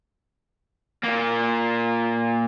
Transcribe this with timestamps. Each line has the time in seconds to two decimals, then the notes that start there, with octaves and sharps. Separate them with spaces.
1.03 A#2 A#3